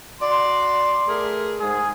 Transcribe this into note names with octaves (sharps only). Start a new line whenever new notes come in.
F#4 D5 C6
A3 G#4 A#4
G#2 G#4